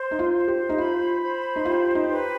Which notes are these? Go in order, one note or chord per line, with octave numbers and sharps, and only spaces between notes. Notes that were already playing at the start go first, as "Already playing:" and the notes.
Already playing: C5 C6
D#4
F4
C5
G4
D#4
F4 B5
C5
D#4
F4 G4
D#4
B4